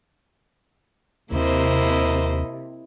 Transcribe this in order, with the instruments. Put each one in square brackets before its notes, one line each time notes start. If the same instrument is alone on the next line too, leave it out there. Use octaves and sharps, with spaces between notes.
[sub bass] D#2 [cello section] C3 [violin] A#3 C5 [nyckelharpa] E4 D#5